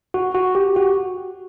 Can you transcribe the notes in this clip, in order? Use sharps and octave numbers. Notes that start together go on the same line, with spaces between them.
F#4
F#4
G4
F#4